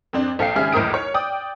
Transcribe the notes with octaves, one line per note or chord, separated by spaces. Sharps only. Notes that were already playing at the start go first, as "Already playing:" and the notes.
F2 C4 D4
A#1 A4 F5 G5 C7
G#1 C#3 G4 G#4 E5 F6
B1 E2 A2 A#4 D#6 D7
C#5
D5 G5 D#6